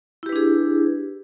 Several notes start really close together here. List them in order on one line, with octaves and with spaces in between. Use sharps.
E4 G4 B4 D4 G#4